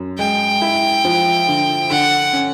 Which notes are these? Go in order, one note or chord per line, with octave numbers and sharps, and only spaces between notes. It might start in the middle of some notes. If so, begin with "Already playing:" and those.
Already playing: F#2
G#3 G5
E4
F3
D3
D3 F#5
C#4